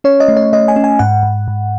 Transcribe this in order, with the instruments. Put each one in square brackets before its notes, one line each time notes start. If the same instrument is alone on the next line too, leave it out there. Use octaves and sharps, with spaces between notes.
[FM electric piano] C#4 C#5
D#5
A3
C#5
A3 D#5
G#5
C#4
G#5
G#2 F#5
G#2
G#2